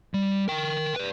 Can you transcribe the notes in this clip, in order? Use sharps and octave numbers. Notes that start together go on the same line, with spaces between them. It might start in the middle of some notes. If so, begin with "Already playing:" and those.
G3
A#4 G5
B4 D5